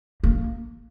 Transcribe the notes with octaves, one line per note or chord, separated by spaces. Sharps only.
A#3